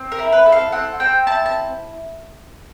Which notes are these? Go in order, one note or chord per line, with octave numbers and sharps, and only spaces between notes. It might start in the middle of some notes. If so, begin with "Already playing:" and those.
Already playing: C4
A#4
E4
B4
A4
F5
C4 F#5
C4 G5
E4 A5
A5